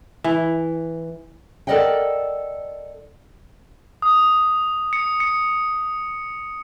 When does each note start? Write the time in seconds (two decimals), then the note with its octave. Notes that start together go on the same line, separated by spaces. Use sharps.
0.24 E3
1.67 A4 A#4 D5 D#5 F#5 G5
4.02 D#6
4.93 C#7
5.20 C#7